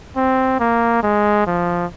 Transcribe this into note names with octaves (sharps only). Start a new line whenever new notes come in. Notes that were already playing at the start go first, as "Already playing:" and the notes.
C4
A#3
G#3
F3